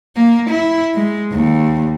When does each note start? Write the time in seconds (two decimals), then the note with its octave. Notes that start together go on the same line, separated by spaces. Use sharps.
0.17 A#3
0.50 E4
0.95 G#3
1.33 D#2